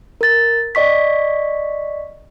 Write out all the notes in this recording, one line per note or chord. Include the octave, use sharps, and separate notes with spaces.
A#4 A6
D5 D#5 C#6 B6